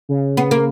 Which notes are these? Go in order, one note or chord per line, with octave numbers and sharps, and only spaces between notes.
C#3
B3
A#3